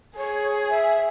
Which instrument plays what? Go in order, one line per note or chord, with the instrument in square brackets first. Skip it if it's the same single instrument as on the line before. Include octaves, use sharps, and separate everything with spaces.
[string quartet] G#4 [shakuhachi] C#5
[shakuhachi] E5